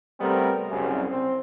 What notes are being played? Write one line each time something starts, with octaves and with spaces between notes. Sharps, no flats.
C3 G3 A3 B3 C4 A#4
C2 F#2 C#3
C4